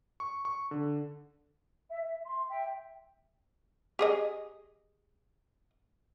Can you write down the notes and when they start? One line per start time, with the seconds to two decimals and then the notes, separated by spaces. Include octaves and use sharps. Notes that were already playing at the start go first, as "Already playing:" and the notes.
0.20 C#6
0.45 C#6
0.71 D3
1.90 E5
2.03 E5
2.24 C6
2.48 E5 G5
3.99 G4 G#4 D#5